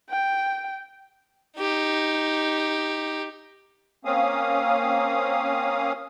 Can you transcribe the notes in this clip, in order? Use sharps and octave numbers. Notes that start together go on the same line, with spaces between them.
G5
D#4 G4
A#3 C4 C#4 F5 D#6